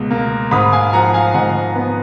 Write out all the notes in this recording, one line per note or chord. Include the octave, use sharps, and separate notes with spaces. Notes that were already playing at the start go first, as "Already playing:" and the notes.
Already playing: C#2 B2
A#3
G#2 B5 D#6
F5 G#5
F3 F#5 A#5
F5 G#5
G#2 D#5 F#5
B3